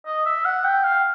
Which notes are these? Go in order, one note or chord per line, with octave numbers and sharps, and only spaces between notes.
D#5
E5
F#5
G5
F5